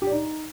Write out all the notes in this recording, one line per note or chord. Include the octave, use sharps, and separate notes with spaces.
G4
D5
D#4